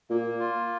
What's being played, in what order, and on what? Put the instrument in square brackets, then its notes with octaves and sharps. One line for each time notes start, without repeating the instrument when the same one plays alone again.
[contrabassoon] A#2 [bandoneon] A#3
[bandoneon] F4